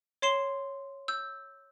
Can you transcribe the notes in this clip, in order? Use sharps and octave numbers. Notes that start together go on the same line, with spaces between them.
C#5 C6 C7 E7 G7
E6 G6